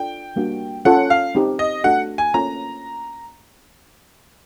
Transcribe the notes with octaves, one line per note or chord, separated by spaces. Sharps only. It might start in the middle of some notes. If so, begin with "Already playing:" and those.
Already playing: D4 F4 A4 D5 G5
G3 A#3 D4 F#4
C#4 F4 A4 C#5 F#5
F5
C4 D#4 G4
D#5
A3 D4 F#4 A4 F#5
G#5
A#3 C#4 F4 A4 C#5 A#5